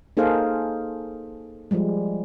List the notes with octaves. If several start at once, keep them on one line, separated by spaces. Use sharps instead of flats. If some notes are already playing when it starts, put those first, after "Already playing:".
A#3 D#4 G#4 A4 C5 F5
F3 G3 G#3